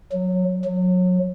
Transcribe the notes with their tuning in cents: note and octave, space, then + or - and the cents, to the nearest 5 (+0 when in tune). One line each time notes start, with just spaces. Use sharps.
F#3 -15
F#3 -30